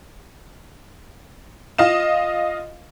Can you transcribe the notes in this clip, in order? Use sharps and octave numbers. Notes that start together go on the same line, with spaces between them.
F4 D#5 F5 E7